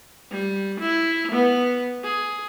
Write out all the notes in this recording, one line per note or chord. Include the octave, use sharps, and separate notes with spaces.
G3
E4
B3
G#4